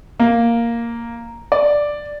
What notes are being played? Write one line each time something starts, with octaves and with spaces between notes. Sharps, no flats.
A#3
D5